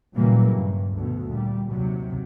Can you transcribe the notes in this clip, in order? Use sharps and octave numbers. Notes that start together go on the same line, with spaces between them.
A#2 C#3 E3 F#3 G3 A#3
G2
D2 B2
A#2 G3
D#2 C3 F#3